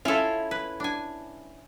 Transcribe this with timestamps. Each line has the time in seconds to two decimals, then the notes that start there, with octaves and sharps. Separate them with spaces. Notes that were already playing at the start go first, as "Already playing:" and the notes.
0.05 C#4 E4 F4 A4
0.51 B4
0.80 D4 G#5